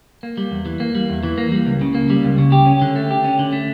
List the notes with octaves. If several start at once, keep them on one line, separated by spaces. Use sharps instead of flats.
A#3
G3
E2
E3
A#3
G3
E2
E3
A#3
G3
C#2
C#3
A#3
G3
C#2
C#3
G4
C#4
D3
A3
G4
C#4
D3
A3